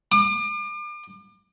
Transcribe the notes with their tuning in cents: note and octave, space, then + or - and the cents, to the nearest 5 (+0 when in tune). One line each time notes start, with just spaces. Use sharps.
D6 +40